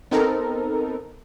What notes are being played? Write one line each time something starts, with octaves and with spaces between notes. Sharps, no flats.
B3 C4 D#4 A4 A#4